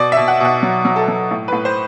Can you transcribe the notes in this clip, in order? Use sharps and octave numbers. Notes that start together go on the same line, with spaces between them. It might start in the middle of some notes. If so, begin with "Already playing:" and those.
Already playing: B2 D5
B2 E5
F#5
B2 F#5
F#3
F#3
A4
F#3
A2
A2 B4
C5